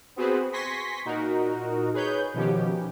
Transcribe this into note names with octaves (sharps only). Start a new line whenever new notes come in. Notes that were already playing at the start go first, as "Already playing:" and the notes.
B3 C4 F#4 G#4 B4 C5
G#5 C6 C#6 A#6 B6
A#2 D#4 F#4 A#4
G#4 B4 C#5 G6
B2 D#3 F3 B3 C#4 G4